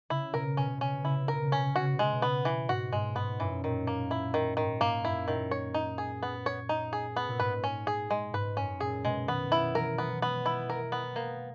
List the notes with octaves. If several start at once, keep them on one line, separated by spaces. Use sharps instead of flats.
C#3 E4
B2 A#4
B2 C#4
C#3
B2 C#4
C#3
B2
C#3 E4
B2
C#3 A#4
B2
C#3
B2 C#4
C#3
B2 F#4
C#3
B2
C#3 G#3
B2
B3
E3
G#2 F#4
G#2 G#3
G#2 B3
F#2 E3
A#2 D#3
A#3
E4
D#3
G#2 D#3
G#2 A#3
F#2 E4
A#2 D#3
C#5
D#4
G#4
B3
C#5
D#4
G#4
B3
A#2
G#2 B4
C#4
G#4
G#3
G#2 B4
F#2 C#4
A#2 G#4
B2 G#3
D#3 B3
F#3 E4
E3 A#4
F#3 B3
G#3 B3
E4
A#4
B3
G#3 A#3